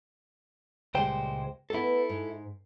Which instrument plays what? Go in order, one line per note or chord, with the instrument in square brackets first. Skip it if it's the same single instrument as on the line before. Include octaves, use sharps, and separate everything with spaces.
[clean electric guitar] C#2 C5 G5 [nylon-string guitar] A#2 G3 G#3
[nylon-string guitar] A3 B3 [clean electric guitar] E4 A4
[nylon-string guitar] G#2